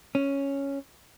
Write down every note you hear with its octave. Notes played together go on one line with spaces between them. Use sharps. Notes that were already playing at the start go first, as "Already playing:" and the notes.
C#4